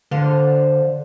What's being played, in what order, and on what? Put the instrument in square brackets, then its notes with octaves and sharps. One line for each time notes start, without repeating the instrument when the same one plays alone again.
[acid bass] D3 [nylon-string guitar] C5 F5